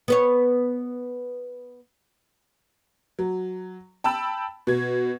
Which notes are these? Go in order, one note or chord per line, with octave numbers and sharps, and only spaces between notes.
B3 B4 C#5
F#3
G5 A5 B5 E6
B2 G#6